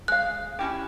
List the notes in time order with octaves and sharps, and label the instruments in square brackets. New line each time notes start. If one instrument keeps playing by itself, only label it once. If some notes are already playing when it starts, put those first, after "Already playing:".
[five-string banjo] G#3 F5 [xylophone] F#6
[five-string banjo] C#4 E4 G4